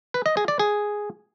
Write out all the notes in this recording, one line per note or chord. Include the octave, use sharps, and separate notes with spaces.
B4
D#5
G#4
D5
G#4